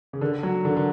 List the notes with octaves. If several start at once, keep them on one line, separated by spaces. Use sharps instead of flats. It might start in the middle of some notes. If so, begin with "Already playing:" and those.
C#3
D3
F#3
D3
D3